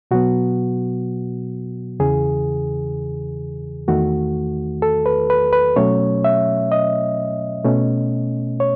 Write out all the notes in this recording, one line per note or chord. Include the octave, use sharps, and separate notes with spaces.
B2 F#3 B3 F#4
E2 C#3 E3 G#4
E2 D#3 A3 F#4
A4
B4
B4
B4
B2 F#3 A3 C#4 C#5
E5
D#5
B2 A3 C#4
C#5